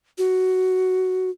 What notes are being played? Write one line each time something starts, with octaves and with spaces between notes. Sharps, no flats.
F#4